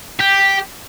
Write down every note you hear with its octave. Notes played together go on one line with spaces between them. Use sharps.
G4